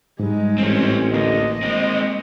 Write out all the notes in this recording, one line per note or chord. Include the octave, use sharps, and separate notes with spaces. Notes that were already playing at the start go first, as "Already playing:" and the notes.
G#2 G3 G#3 D#4
A1 C4 C#4
D2 A#3 D#5
G#3 C4